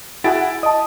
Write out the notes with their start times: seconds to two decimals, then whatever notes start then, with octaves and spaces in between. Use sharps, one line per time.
0.24 E4 F#4 G#4 F#5 A6 D7
0.63 D#5 A5 D#6